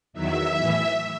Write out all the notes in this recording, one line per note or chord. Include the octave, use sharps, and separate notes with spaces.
E2 D#3 F#3 E5
A2 E3